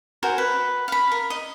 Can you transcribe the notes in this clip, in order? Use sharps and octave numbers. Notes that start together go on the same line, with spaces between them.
F#4 A#4 C5 G#5
B4
F5 B5
A#4
D#5